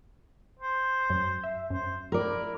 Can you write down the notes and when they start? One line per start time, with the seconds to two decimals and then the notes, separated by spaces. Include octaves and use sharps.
0.59 C5
1.10 F#2
1.44 E5
1.70 F#2 C5
2.12 E4 A#4 D5